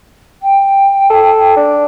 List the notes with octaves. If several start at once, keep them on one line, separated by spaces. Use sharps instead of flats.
G5
A4
D4